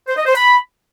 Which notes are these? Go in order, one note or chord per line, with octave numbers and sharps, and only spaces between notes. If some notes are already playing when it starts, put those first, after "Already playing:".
C5
D#5
C5
B5